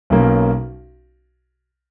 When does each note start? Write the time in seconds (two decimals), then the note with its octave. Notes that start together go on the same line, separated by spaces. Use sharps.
0.10 B1 B2 A#3 C#4